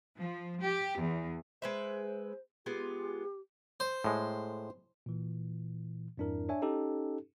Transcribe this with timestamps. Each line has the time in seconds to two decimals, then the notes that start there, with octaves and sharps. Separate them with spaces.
0.19 F3
0.65 G4
1.01 E2
1.62 G#3 B4 C5 E5
2.66 G#3 B3 F4 G4
3.80 C5
4.04 A2 G#3
5.06 A#2 E3
6.18 F2 G#2 D4 E4 A#4
6.49 D4 C#5 E5 G#5
6.62 C#4 D#4 G4 A4